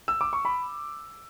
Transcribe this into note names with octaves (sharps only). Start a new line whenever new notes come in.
E6
D6
C#6
B5